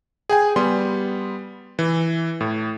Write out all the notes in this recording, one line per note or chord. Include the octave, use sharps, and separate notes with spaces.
G#4 G5 G#5
G3 B3 C6
E3
A2